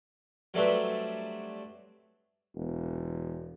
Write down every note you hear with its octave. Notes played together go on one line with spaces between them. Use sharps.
F#3 G3 A3 C4 D4 B4
E1